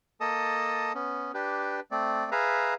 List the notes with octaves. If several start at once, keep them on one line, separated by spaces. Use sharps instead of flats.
A#3 A4 D#5 A5 D#6
B3 C#4
D4 G4 B4
A3 C4 D5
G#4 B4 E5 F5 A#5